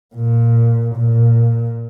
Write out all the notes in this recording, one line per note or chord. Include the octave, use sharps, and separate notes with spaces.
A#2
A#2